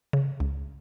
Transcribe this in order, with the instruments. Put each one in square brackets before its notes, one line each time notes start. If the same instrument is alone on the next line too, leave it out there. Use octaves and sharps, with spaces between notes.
[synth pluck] C#3
C#2